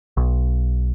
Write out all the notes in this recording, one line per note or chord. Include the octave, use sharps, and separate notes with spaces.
B1